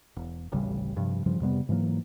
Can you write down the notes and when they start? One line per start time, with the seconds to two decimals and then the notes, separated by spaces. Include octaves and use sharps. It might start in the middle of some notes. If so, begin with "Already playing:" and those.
0.16 E1
0.52 D1 A1 C#3 G3
0.97 G2 C3 F3
1.26 G2 C#3 F3 G3
1.40 F2 C3 G3 B3
1.69 G#2 E3 F#3 A#3